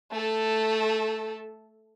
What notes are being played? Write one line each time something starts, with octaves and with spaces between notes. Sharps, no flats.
A3 A4